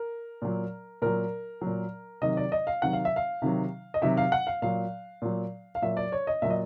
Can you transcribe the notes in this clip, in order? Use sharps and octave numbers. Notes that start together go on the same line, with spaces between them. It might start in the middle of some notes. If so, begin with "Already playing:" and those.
Already playing: A#4
A#2 F#3
A#2 F#3 A#4
A#2 F#3
C3 D#3 F#3 D#5
D5
D#5
F5
C3 D#3 F#3 F#5
F5
E5
F5
C3 D#3 F#3
D#5
C3 D#3 F#3 E5
F5
F#5
F5
A#2 F#3 F5
A#2 F#3
F5
A#2 F#3 E5
D5
C#5
D#5
A#2 F#3 E5
D#5